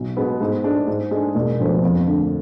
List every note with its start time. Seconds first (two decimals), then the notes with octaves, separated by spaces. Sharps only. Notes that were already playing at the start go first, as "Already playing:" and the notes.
Already playing: B1
0.17 B2 G#3 B3
0.41 G#2
0.64 G#3 D4
0.87 G#2
1.11 G#3 D4 G#4
1.35 E1
1.59 D2 D3 F3 B3
1.83 F2
2.06 D3 A3